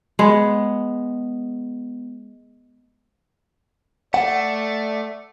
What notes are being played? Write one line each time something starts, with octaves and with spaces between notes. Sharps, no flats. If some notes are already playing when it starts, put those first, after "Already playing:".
G#3 B3
A3 D5 F#5